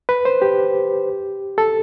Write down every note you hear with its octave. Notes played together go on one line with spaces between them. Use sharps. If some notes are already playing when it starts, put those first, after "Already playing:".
B4
C5
G4
A4